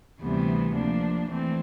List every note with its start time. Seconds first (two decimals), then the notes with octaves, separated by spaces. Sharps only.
0.22 D2 C3 E3 G3 B3
0.75 F3 A#3 D4
1.29 E3 A3 C4